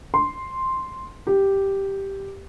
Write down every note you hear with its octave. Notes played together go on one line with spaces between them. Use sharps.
C6
G4